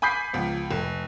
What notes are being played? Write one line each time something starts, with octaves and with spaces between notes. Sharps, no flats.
G#5 B5 D6 G6 B6 C7
C#2 F3 B3
F1